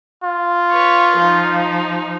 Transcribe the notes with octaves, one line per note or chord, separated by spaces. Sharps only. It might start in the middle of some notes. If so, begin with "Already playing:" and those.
F4
B4 C#5
F3 D#4